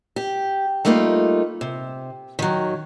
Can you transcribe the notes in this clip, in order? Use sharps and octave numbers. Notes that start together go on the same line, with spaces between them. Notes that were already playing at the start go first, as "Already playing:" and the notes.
G4
G3 A3 A#3 D#4 F4
C3
D#3 F#3